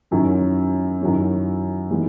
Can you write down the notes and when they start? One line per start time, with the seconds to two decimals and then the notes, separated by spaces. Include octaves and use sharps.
0.11 F#2 D#3 F#3 C#4 E4
1.01 F#2 D#3 F#3 C#4 E4
1.91 E3 G#3 B3 D#4